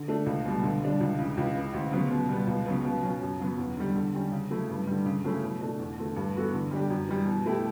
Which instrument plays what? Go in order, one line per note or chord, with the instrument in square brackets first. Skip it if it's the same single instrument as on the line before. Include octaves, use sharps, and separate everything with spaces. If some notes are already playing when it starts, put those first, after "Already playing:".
Already playing: [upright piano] D3
A3 D4
C#2
B2 G3
D3
G3 D4
C#2
C#3 E3
C#2
C#3 E3
D2
C#3 F#3 B3
B2
G3 B3
C#2
C#3 F#3 B3
B2
F#3 C#4
F#2
C#3 F#3 B3
E2
D3 G3
D3
G3 C#4 G4
C#3
F#3 A3 E4
G2
D3 G3
C#3
F#3 A3 C#4 E4
B2
A3 D4
E2
D3 A3
G2
E3 B3 F#4 A4
D3
G3 D4 G4
F#2
E3 G3
B2
A3 E4 G4